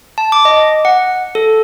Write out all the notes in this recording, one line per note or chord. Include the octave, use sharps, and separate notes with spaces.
A5
D6
D#5
F#5
A4